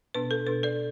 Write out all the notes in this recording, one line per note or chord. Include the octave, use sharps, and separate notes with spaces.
B2 B3 D4 B4
A4
B2 B3 D4 B4
A4 D5